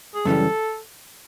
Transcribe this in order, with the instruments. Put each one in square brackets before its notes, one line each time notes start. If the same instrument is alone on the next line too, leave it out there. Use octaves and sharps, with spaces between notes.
[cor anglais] G#4
[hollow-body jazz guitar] F#2 C#3 E3 G3 [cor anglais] A4